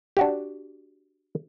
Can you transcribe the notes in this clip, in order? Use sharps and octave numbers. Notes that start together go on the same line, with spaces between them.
D4 F#4 G4